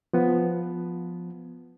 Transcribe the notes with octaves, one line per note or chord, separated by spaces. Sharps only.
F3 B3